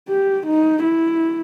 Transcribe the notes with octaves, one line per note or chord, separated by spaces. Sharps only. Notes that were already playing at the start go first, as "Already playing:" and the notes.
G4
D#4
E4